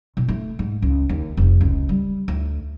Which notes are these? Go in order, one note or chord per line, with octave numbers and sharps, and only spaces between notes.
B2
A3
G#2
C#2
D#2
F1
C#2
G3
D2